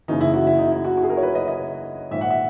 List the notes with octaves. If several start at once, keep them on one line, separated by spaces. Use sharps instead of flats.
F#1 F#2 C#3 E3 D#4
E4
F#4
E4
D#4
E4
F#4
F#4
G#4
A#4
C#5
B4
D#5
D#5
A#1 G#2 D#3 E5
F#5
E5